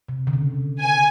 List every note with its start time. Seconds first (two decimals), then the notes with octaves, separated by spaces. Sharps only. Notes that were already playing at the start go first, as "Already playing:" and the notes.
0.09 C3
0.27 D3
0.33 C#3
0.81 G#5